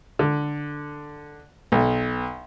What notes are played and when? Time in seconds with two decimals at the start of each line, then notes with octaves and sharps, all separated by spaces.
0.19 D3
1.72 B1